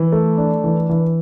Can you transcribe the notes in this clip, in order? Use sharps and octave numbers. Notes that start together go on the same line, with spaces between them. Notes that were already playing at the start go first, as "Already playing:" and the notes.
Already playing: E3
A3
D4
E3
E3